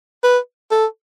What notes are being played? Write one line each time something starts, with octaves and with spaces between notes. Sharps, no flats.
B4
A4